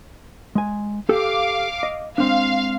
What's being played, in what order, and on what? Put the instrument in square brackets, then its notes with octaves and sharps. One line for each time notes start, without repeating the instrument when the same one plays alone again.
[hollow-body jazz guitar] G#3 G#5
[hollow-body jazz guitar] G4 A4 [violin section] F5 D6
[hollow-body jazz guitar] D#5
[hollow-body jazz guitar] G#3 C4 D4 [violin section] F5